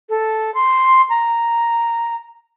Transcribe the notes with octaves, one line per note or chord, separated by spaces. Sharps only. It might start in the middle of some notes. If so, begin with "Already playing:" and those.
A4
C6
A#5